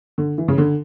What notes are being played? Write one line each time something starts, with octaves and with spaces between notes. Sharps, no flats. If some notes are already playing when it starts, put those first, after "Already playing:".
D3
E3
C#3
D3